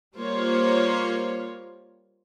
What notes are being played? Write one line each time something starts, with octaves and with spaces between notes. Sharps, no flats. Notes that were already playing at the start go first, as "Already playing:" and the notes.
G3 A#3 F4 C5 C#5